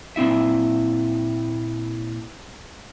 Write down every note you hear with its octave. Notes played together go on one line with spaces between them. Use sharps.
A#2 C4 E4 E5